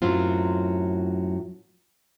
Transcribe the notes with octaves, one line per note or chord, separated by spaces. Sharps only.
F#2 A2 F#3 C4 F4